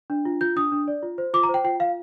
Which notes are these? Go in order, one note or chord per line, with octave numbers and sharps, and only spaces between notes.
D4
F4
F4 G6
D4 D#6
D4
D5
F4
C5
F4 D6
A#5
C5
G5
F4 G5
F4 F5